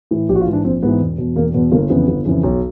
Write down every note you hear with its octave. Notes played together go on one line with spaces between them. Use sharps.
A2 E3
A#1 G4
F#4
F4
G#2 E3
D4
A#1 C4
G#2 E3 B3
E1
E2 B2
E1 A#3
E2 B2 B3
G1 A#3
F2 C#3 E3 B3
G1
F2 C#3 E3
B1